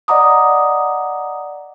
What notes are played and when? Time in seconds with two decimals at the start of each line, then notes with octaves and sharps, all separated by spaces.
0.08 D5 D#5 F#5 A#5 D6 D#6